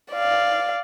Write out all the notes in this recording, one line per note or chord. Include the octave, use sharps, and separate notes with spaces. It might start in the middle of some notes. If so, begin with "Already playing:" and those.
D5 F5